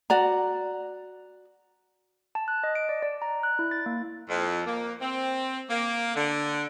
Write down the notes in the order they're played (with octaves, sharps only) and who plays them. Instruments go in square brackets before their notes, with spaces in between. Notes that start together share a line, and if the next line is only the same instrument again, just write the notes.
[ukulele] F#4 D5 A#5
[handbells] A5
F#6
D#5
D7
D5
D5
A#5
F#6
E4
A6
A#3
[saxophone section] F2
A#3
C4
A#3
D3